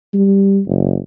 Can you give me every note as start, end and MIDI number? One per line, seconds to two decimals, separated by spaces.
0.14 0.60 55
0.66 0.98 30